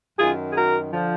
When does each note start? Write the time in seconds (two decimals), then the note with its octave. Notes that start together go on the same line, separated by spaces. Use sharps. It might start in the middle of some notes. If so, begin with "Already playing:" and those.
0.19 F#2 D#3 F4 G#4
0.51 G#4
0.56 F#4 A#4
0.93 D3 F3